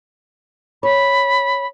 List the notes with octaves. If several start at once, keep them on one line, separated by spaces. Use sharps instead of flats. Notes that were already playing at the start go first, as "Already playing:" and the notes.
C#5 B5